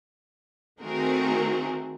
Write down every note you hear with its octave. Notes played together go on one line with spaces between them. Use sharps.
D#3 A3 C4 F#4 G#4 A#4